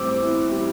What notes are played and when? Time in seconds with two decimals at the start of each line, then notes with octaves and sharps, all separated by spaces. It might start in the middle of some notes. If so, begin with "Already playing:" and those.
Already playing: A2 G3 C4 D6 E6
0.22 E3
0.51 G3